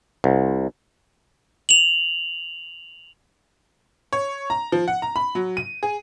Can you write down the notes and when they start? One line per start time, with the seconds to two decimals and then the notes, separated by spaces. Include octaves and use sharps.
0.24 C2
1.69 F7 F#7
4.13 C#5
4.50 A#5
4.72 F3
4.88 F#5
5.02 A#5
5.16 B5
5.35 F#3
5.57 D#7
5.83 G#4